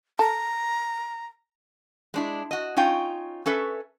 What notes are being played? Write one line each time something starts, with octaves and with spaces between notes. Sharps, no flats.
A4 A#5
G#3 D4 E4
F#4 D#5
C#4 D#4 F4 G5
C#4 A4 B4 E5